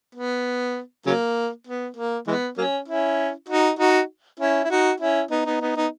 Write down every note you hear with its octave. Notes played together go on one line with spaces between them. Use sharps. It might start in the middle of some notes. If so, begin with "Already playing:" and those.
B3
C#3 F#3 A#3
B3
A#3
E3 G#3 B3
F#3 A#3 C#4
C#4 E4
D#4 F#4
D#4 F#4
C#4 E4
E4
D#4 F#4
C#4 E4
B3 D#4
B3 D#4
B3 D#4
B3 D#4